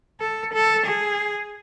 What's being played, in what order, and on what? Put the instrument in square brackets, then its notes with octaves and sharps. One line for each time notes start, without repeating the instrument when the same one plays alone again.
[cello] A4
A4
G#4